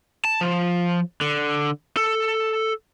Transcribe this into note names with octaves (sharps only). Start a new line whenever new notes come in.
A5
F3
D3
A4